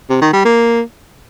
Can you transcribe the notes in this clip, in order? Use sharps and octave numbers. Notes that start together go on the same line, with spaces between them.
C3
D#3
G3
A#3